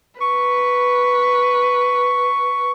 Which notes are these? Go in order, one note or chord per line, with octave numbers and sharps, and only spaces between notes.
B4 C#6